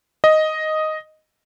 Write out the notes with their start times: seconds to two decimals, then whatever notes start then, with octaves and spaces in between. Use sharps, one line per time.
0.24 D#5